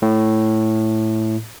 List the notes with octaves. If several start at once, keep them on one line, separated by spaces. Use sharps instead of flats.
A2